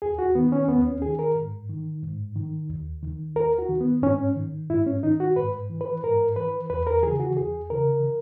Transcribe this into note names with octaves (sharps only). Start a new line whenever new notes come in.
D#2 G#4
F#4
D#3 B3
C#4
D#2 B3
C#4
D#3 G#4
A#4
G#2
D#3
G#2
D#3
D#2
D#3
D#2 A#4
F#4
D#3
B3
G#2 C#4
D#3
G#2 E4
C#4
D#3 D#4
F#4
G#2 B4
E3
B4
G#2 A#4
E3 B4
E2 B4
A#4
C#3 E3 G#4
F#4
E2 G#4
C#3 E3 A#4